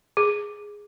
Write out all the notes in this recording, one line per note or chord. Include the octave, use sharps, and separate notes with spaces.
G#4